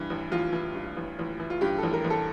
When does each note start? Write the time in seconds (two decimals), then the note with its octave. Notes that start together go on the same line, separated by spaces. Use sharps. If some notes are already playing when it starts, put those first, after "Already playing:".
Already playing: G2 E3
0.10 A1
0.31 A1 F4
0.53 E3
0.75 G2
0.96 A1
1.19 A1
1.40 E3
1.50 F4
1.61 G2 G4
1.78 A1 A4
1.93 A#4
2.04 A1
2.10 A4